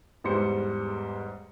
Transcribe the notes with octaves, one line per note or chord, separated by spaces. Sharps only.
E2 G#2 G3 C5 C#7